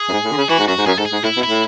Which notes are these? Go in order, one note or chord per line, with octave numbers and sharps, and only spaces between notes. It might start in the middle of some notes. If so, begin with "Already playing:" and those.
Already playing: G#4
F#2
G#2
A2
D3
C#3
E3 F#4
G#2
F#2 F#4
G#2
F#2 G#4
G#2 A4
G#4
G#2
A2 E4
B2
E4
A2